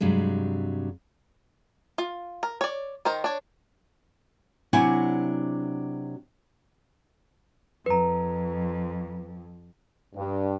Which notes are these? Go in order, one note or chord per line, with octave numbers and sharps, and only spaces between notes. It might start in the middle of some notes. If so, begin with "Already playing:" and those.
G2 C3 F#3 G#3
F4
A#4
C#5 D5
D#3 A#4 C5
D4 C#5
C3 F#3 D4 E4 F#4 G#5
F2 B4 A#5
G2